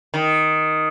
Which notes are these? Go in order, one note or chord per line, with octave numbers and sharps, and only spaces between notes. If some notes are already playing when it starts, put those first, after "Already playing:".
D#3